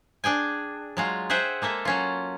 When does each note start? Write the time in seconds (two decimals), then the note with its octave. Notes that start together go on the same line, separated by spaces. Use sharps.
0.24 D4 G#4 G5 G#5
0.97 F#3 G#3 F4
1.30 G#4 C5 E5 F#5 G5
1.62 G#3 A#3 A4 E5
1.85 F#3 C#4 F4